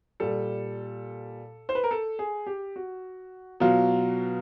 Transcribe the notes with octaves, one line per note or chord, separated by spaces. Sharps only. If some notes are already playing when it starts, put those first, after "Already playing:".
A#2 G3 A4
C5
B4
A#4
A4
G#4
G4
F#4
B2 F#3 F4